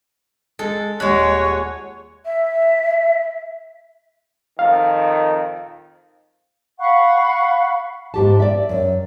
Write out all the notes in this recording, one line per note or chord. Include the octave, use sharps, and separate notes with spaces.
G#3 A4
D#1 G#3 C#5 F#5 B5 F#6
E5
F2 D#3 F5
F5 F#5 B5 C#6
G#2 G4 A5
D5 E5
F#2